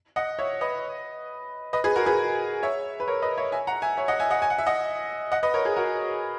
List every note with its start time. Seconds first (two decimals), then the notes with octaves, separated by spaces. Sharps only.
0.16 D#5 F#5
0.39 C#5 E5
0.61 B4 D#5
1.73 B4 D#5
1.84 G#4 B4
1.96 F#4 A#4
2.06 G#4 B4
2.63 C#5 E5
3.00 B4
3.08 A#4 C#5
3.22 B4 D#5
3.37 C#5 E5
3.52 E5 G#5
3.67 F#5 A#5
3.82 E5 G#5
3.97 C#5 E5
4.08 D#5 F#5
4.20 E5 G#5
4.30 D#5 F#5
4.42 G#5
4.50 F#5
4.58 E5
4.67 D#5 F#5
5.32 D#5 F#5
5.43 B4 D#5
5.54 A#4 C#5
5.65 G#4
5.77 F#4 A#4